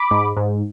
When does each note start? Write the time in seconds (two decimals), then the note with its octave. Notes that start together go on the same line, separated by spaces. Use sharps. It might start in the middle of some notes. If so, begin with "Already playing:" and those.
Already playing: B5 D6
0.11 G#2
0.37 G#2